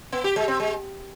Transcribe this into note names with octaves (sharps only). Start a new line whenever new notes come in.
B3
G4
G#3
C4
G#3